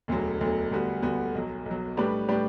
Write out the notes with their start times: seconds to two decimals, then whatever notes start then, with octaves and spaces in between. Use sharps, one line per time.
0.08 E1 D2 D3 F#3
0.40 E1 D2 D3 F#3
0.72 D2 D3 G3 B3 F#4
1.02 D2 D3 G3 B3 F#4
1.35 B1 B2 F#3
1.66 B1 B2 F#3
1.97 A2 G3 D4 G4 B4
2.28 A2 G3 D4 G4 B4